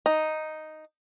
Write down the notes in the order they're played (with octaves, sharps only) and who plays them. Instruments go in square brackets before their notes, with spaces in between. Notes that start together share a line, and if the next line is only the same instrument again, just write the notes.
[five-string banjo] D#4